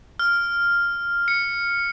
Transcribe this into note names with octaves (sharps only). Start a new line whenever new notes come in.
F6
C#7